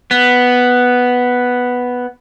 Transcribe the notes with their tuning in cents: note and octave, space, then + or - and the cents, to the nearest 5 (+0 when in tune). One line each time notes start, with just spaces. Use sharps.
B3 +0